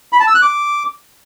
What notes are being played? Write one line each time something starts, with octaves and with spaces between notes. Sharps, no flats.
B5
A5
E6
F#6
D6